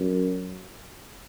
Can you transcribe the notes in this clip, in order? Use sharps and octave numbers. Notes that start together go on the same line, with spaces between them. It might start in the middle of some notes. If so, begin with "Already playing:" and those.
Already playing: F#2